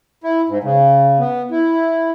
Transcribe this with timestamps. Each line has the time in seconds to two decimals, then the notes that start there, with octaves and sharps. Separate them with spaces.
0.24 E4
0.49 G#2
0.64 C#3
1.19 B3
1.51 E4